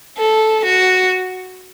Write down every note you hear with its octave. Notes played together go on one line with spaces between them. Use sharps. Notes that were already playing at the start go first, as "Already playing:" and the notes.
A4
F#4